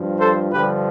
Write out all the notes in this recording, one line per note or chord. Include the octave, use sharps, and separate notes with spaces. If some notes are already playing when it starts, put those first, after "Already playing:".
Already playing: G2 F3
A4 C5
G2 D3 F3 G4 B4